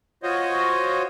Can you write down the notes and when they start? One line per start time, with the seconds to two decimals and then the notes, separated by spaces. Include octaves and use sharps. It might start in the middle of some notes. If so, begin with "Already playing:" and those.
0.23 F4 F#4 C5 C#5 D#5